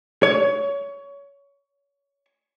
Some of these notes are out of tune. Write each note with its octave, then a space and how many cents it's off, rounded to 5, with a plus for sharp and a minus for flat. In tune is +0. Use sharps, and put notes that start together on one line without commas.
C#5 +25